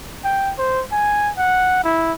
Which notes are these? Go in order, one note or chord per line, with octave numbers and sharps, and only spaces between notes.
G5
C5
G#5
F#5
E4